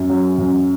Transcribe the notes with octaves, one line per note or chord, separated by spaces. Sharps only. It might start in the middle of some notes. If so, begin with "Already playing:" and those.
Already playing: F#2
F#3
F#2